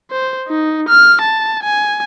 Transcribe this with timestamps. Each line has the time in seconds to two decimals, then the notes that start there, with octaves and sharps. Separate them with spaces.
0.11 C5
0.48 D#4
0.89 F6
1.22 A5
1.63 G#5